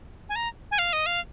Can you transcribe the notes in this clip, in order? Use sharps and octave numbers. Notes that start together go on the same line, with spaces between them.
G#5
A#5
G#5
F5
D#5
F5